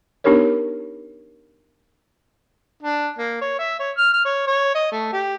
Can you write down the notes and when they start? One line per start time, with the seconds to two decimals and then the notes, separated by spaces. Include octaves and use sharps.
0.24 B3 D4 D#4 G4 A#4 C#5
2.83 D4
3.18 A#3
3.41 C#5
3.58 E5
3.80 C#5
3.97 F6
4.13 F6
4.25 C#5
4.47 C#5
4.75 D#5
4.92 A3
5.13 G4